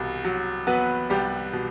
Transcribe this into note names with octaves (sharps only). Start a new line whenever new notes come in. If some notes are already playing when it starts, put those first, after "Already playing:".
Already playing: C2 B2
F#3
F#3 B3 B4
C2 G3 G4
B2